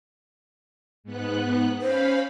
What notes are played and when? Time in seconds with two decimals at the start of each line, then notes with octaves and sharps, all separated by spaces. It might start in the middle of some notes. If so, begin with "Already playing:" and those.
1.04 G#2 B3 F#6
1.81 C#4 C5 F5 B5